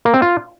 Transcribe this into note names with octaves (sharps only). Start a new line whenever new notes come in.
A#3
C4
F4